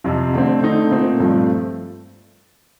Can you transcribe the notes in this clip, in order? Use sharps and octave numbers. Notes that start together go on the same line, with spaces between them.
F2 C3 F3
D3 A3 C4
D3 A3 C4 D#4
A#2 A3 C4 D#4
G2 F3 A3 C4